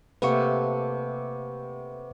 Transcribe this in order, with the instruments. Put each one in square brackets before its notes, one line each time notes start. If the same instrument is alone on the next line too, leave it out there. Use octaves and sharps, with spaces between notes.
[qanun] C3 A3 A#3 [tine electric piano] B4 F#5 C#6